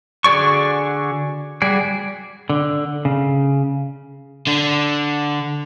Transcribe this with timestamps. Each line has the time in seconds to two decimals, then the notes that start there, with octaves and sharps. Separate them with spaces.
0.24 D3 F#4 G#4 D5 C#6
1.62 G3 F#4 G#4 D5
2.50 D3
3.05 C#3
4.47 D3 D4